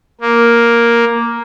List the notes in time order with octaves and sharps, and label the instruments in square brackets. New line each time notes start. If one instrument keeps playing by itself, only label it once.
[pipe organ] A#3